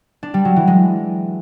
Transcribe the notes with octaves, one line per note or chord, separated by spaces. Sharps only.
D4
G3
F#3
E3
G#3